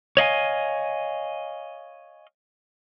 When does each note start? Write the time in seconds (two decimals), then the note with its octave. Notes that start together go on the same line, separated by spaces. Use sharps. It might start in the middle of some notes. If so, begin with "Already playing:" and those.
0.17 C#5 D#5 F5 G#5